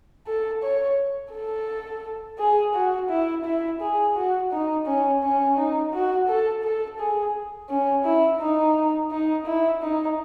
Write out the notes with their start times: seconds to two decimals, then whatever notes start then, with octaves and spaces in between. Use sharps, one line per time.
0.27 A4
0.62 C#5
1.33 A4
2.38 G#4
2.74 F#4
3.09 E4
3.44 E4
3.81 G#4
4.15 F#4
4.52 D#4
4.86 C#4
5.22 C#4
5.56 D#4
5.93 F#4
6.28 A4
6.63 A4
6.99 G#4
7.69 C#4
8.05 E4
8.40 D#4
9.11 D#4
9.46 E4
9.82 D#4